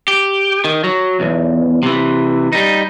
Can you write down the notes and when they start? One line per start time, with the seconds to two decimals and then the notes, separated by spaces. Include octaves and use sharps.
0.08 G4
0.64 D#3
0.84 F#3
1.20 B1 E2
1.83 C3 E3
2.53 G3 D#4